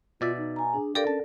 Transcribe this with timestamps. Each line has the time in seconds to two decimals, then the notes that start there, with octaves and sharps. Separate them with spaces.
0.21 B2 F4 D5 E5
0.38 D#4
0.56 G#5 A#5
0.74 D4 G#4
0.95 G4 A4 A#4 D5 F5
1.07 C#4 A5